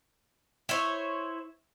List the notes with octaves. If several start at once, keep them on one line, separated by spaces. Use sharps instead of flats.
E4 C5 C#5